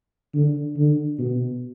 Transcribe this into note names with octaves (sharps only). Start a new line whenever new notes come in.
D3
D3
B2